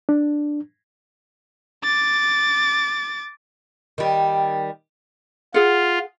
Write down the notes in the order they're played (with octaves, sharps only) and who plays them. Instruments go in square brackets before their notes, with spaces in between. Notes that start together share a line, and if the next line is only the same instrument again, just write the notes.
[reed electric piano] D4
[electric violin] D6 A6
[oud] D#3 G3
[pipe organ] F4 [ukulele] G#4 F#5